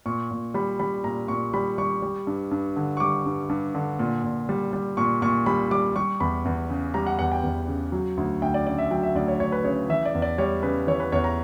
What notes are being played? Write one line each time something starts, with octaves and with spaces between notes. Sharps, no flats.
A#2 C#6
A#2
G3 B5
G3 B5
A#2 A#5
A#2 C#6
G3 B5
G3 C#6
G3
G2
G2
D3
C#6
G3 D6
G2
G2
D3
A#2
A#2
G3
G3
A#2 C#6
A#2 C#6
G3 B5
G3 D6
G3 C#6
E2 B5
E2
C#3
G3 A#5
F#5
E2 F#5
G5
E2
C#3
F#3
D2
D2 G5
D5
C#3 D5
E5
F#3 G5
E5
D2 D5
C#5
D2 C#5
B4
C#3 C#5
E3 E5
D5
E2
D5
G3 C#5
C#3 B4
E3 C#5
B4
E2 C#5
A#5